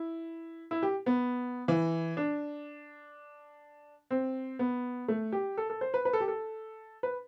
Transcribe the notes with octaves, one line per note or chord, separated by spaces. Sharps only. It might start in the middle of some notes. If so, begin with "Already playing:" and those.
Already playing: E4
E4
G4
B3
E3
D4
C4
B3
A3
G4
A4
A4
C5
B4
B4
A4
G4
A4
B4